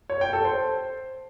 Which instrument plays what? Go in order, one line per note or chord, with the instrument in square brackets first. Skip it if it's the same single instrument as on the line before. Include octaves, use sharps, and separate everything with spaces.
[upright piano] C#5
G5
A4
C5